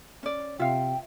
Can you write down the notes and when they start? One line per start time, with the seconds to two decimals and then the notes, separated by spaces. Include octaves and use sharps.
0.23 C#4 D5
0.60 C3 F4 E5 F5 G5